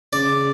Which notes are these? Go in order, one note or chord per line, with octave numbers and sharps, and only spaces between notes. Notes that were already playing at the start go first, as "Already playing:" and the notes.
C#3 D5